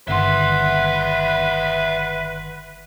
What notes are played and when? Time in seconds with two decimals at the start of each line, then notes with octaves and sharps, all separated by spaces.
0.08 G1 D#3 B4 E5 F#5 C6